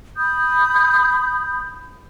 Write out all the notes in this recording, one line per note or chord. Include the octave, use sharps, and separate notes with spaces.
B5 D#6 G6